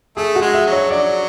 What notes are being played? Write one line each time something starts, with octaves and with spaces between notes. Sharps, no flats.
A3 G#4
F#4
G#3
E5
F#3
C#5
F#3 D5